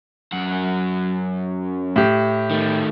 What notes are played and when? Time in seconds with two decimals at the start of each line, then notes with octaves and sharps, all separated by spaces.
0.32 F#2 F#5
1.96 A2 G4
2.50 D#3 A3